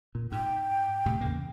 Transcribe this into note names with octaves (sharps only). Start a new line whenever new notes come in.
A#2
G#2 G5
A2 C3
E2 C#3 A#3